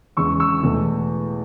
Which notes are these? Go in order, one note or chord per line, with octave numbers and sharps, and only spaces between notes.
E2 C#3 G#3 C#6 E6
C#6 E6
E2 B2 A3